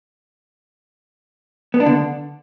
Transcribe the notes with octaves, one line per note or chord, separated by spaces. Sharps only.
B3
D4
D3